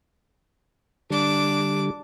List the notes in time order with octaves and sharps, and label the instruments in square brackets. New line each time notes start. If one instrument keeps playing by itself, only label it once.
[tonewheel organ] D3 G3 [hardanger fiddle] D4 D6